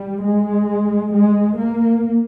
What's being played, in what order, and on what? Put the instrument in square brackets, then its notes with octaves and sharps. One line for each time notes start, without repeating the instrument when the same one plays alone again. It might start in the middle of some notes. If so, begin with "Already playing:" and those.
Already playing: [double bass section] G3
G#3
G#3
A#3